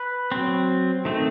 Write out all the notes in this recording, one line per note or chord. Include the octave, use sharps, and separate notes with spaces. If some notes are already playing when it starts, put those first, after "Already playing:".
Already playing: B4
F#3 C4
D#3 A3 C4